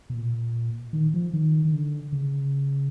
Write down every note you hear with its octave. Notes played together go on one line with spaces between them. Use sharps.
B2
A#2
D#3
F3
D#3
D#3
D3
C#3